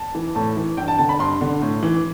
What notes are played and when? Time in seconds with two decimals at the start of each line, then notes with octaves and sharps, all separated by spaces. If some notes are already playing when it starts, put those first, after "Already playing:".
Already playing: A5
0.15 E3
0.35 A2 A5
0.57 E3
0.77 G2 G5
0.88 A5
0.99 D3 A5
1.09 B5
1.19 G2 C6
1.41 D3
1.62 A2
1.83 E3